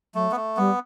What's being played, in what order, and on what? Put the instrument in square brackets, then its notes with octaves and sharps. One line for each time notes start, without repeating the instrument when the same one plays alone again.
[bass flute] F#3 [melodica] A3
[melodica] B3
A3
[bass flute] G3 [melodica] B3